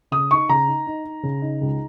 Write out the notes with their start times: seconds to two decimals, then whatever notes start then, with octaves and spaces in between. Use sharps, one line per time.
0.11 C#3 D#6
0.31 D#4 C#6
0.49 C#3 A#5
0.68 D#4
0.87 D#4
1.05 D#4
1.23 C#3
1.42 D#4
1.61 C#2